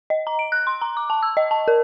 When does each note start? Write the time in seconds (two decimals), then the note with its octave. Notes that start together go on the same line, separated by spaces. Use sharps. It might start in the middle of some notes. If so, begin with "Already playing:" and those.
0.10 D#5
0.27 A#5
0.39 D7
0.52 F#6
0.67 C6
0.82 A#5
0.97 D6
1.10 A5
1.23 E6
1.37 D#5
1.51 A5
1.68 A#4